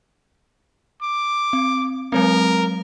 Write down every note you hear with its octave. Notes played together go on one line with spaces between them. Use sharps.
D6
C4
F#3 G#3 C4 A#4